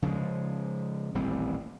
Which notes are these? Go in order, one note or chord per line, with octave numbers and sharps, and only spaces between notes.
C#3 F3 G3 G#3
D#1 A1 G3 C4